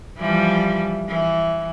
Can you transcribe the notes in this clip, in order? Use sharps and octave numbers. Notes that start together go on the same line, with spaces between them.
E3 F3 G3
E3